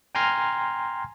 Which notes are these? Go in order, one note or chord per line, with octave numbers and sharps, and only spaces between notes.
G5 G#5 A#5 C6 F6 G#6